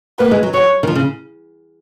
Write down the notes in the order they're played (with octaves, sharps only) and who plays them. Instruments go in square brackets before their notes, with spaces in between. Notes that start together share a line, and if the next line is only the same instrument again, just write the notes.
[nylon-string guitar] A#3 [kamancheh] B4
[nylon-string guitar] G#3
F#3
[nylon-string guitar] F#3 [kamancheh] C#5
[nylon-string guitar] D#3
F3
C#3